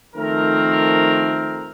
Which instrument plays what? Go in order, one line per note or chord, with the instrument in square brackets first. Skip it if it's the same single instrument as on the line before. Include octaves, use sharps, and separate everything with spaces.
[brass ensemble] D#3 F3 A3 C4 A#4